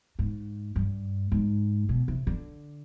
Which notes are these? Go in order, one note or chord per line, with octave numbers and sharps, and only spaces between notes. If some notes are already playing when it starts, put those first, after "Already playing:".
G#2
G2
G#2
B2
C3
D3